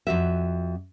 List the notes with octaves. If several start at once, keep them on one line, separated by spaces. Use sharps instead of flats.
F2 F#4 E5